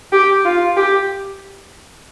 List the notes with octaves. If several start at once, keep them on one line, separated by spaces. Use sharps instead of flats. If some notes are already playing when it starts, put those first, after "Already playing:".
G4
F4
G4